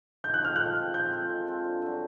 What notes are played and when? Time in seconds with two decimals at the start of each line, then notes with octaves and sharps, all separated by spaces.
0.24 G#3 G6
0.34 F#6
0.42 C4 F4 A4 F6
0.56 G#3 F#6
0.76 C4 F4 A4
0.94 G#3 G6
1.11 C4 F4 A4
1.29 G#3
1.47 C4 F4 A4
1.64 G2
1.82 D3 F#3